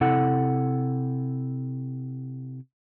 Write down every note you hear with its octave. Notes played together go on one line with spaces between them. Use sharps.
C3 E4 A4 F#5